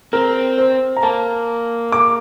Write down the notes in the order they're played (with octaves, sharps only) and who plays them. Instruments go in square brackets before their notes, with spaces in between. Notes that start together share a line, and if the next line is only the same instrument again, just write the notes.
[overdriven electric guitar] C4 [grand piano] A#4
[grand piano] C5
A#5
[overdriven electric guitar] A#3 [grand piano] A5
[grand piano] D6